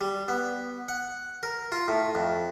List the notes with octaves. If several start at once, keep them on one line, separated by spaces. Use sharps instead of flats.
G3
B3
F#5
A#4
F4
A2
F2